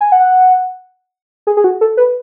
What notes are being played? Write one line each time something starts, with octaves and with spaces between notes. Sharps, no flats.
G#5
F#5
G#4
G#4
F#4
A4
B4